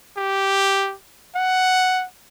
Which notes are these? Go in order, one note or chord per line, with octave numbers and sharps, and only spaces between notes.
G4
F#5